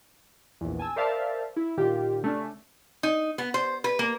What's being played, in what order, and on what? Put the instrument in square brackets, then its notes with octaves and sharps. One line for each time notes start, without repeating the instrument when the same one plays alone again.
[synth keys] A#1 E2
G#5 A5 E6
A#4 C5 D5 E5 F5 A5
E4
A#2 D#3 F4 G4
C#3 A3 C#4 D4
[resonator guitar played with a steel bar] D#4
B3
C5
B4
A#3